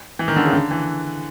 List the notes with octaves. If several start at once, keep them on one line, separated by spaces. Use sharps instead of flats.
E3
D#3
D3
C#3
D3
E3